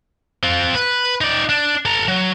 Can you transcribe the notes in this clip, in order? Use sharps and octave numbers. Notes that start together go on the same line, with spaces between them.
C4 F4
B4
D#4 D5
D4
A4 A#5
F#3